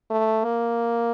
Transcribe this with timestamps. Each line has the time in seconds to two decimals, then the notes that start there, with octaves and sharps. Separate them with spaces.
0.10 A3
0.44 A#3